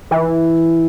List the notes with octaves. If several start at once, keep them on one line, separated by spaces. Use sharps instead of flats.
E3